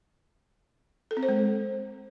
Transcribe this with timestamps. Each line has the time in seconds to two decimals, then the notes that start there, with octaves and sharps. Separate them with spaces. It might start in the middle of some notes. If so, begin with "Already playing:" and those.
1.11 A4
1.17 C4
1.23 C5
1.29 G#3